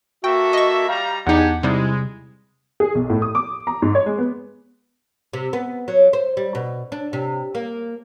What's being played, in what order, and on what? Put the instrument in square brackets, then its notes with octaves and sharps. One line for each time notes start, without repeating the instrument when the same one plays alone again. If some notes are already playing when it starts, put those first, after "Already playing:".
[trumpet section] A#3 A4 E5 [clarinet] F#4 [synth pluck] G5
[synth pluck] D#5 C#6
[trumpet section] G3 A#5 [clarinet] F5
[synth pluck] E2 D#4 [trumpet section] D4 G4 G#5 [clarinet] F#5
[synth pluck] C3 G3 [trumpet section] G#3 [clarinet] E4
[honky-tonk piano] G#4
B1
A2
D#6
D6
A#5
G#2
C#5
G#3
B3
[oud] C3
B3
F#3
C5
G3
B2
D4
C3
A#3